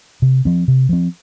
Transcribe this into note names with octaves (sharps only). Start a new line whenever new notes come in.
C3
F3 C4
C3
F3 C4